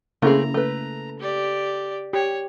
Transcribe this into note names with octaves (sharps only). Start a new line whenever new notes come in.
C#3 A3 A#3 C4 E4 G#4 A#5
A3 B4
G4 D5
G4 C#5